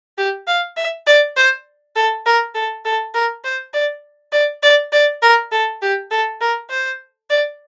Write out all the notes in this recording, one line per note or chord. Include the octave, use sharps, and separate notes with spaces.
G4
F5
E5
D5
C5
A4
A#4
A4
A4
A#4
C5
D5
D5
D5
D5
A#4
A4
G4
A4
A#4
C5
D5